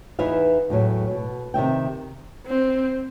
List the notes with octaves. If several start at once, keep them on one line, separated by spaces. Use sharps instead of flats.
E2 E3 D#4 B4 E5 F5
E2 A2 F#3
B2
C3 D#3 E5 G5
C4